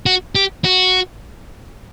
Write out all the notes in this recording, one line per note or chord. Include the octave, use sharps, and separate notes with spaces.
F#4
G4
F#4